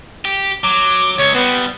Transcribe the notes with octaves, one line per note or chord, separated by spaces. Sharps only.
G4
F#3 D6
C#2 C#5
G3 B3 C4